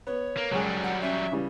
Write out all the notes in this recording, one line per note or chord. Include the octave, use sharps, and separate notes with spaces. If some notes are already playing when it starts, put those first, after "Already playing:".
B3 C#5
A#3
C#2 F#2 F#3 G3 G#4
F#5
C#4 E5
C#3 E3 G3